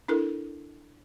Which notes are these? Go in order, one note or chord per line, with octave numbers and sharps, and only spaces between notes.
D4 E4 A4 A#4